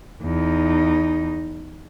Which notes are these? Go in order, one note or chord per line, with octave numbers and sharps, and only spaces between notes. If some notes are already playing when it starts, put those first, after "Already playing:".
E2 D#4